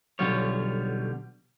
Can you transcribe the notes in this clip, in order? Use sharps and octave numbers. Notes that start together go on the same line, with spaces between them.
B1 D3 F#3 G3 F4 C#5